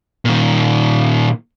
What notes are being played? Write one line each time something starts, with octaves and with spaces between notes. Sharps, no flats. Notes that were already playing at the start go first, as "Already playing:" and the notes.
A#2 D#3